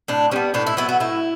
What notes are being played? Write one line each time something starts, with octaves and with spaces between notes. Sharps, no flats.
A2 D4
G3 B3 C#4
A2 D4
E4
F#3 B3 E4
F#4
A2 E4